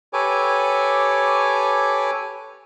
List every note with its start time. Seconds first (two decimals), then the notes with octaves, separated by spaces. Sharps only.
0.13 G4 A4 B4 C#5 G#5 D6